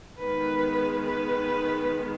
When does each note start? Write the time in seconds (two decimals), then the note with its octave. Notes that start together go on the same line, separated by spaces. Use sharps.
0.19 D#3 G#3 B3 B4
1.04 B4